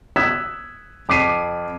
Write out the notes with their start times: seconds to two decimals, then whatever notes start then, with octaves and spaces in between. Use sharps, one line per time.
0.16 D#6 E6 F#6 G#6 B6 E7
1.09 F2 D6 B6 C7 D#7